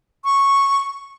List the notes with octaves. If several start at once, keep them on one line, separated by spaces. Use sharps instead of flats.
C#6